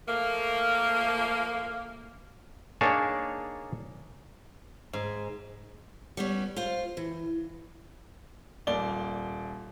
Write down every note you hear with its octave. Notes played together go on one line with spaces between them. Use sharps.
F3 A3 A#3
A#3 D4 D#4 G#4 C#5 A5
G#2
G3 B3 C#4
F4 C5 F5
E3
D#1 A#3 D5 G7